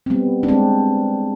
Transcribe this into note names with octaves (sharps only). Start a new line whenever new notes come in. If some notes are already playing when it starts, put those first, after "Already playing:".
C4
G3 B3
D4
G#3 C4